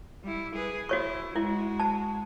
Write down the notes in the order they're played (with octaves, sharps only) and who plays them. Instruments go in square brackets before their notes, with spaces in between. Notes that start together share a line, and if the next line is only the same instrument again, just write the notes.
[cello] G3 E4
G#4 B4
[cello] E4 [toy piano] F#4 C#5 C#6
[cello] G#3 F#4 [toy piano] E4
[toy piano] A5